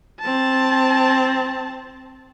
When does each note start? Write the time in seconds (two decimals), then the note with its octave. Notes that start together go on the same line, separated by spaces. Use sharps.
0.21 C4 A5